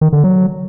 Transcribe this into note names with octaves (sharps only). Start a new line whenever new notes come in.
D#3
D3
F#3